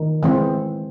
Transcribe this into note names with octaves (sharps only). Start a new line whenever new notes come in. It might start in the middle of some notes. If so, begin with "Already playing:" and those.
Already playing: D#3
E3 G#3 C4